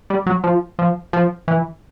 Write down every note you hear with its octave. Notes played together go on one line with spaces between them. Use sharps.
G3
F#3
F3
F3
F3
E3